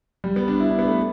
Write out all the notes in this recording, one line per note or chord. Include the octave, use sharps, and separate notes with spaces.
G3
B3
D4
E4
D4
B3
A3